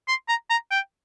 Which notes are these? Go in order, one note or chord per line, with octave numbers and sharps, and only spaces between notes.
C6
A#5
A#5
G5